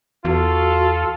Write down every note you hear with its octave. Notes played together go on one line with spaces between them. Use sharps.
E2 F4 F#4 A4